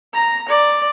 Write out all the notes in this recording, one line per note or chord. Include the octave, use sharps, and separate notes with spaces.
A#5
D5